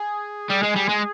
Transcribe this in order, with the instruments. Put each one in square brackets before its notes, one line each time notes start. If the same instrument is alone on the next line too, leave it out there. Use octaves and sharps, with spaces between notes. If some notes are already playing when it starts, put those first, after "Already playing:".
Already playing: [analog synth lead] G#4
[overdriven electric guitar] G3
G#3
G3
G#3